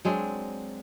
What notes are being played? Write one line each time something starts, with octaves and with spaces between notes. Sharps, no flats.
F#3 G#3 C4 D4